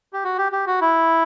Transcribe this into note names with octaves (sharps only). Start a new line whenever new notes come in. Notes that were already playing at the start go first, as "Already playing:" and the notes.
G4
F#4
G4
G4
F#4
E4